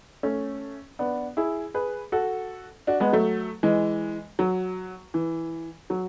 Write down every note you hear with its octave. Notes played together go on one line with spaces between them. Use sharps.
A3 C#4
B3 D4
E4 G#4
G#4 B4
F#4 A4
D4 F#4
G#3 B3
F#3 A3
E3 G#3
F#3
E3
F#3